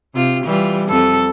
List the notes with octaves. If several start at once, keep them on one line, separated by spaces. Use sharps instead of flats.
C3 F4 G4
E3 G3 F4
F2 A4